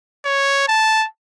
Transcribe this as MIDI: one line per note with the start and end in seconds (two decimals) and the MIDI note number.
0.25 0.65 73
0.68 1.06 81